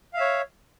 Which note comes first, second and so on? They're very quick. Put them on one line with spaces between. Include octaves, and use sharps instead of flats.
F5 E5 C#5